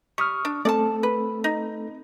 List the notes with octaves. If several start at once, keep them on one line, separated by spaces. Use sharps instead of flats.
G3 C#6 D#6 F6
D4
A3 C4 A4 D5 A5
B4
D#4